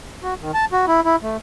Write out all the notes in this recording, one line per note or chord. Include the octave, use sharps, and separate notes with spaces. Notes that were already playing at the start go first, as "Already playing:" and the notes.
F#4
D#3
A5
F#4
E4
E4
A3